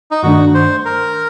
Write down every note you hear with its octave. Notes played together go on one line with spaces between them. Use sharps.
D#4
G2 D#3 A3 D4 F#4
C5
A#4